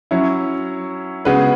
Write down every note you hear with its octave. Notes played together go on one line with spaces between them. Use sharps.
F#3 C#4 E4
C#3 G#3 B3 F#4 B4